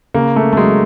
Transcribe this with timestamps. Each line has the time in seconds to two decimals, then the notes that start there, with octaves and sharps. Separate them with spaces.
0.14 C#3 A#3
0.36 A3
0.53 A3
0.57 F#3 G#3